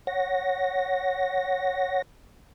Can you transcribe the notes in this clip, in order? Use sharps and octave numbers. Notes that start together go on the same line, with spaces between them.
C#5 F#5 A#6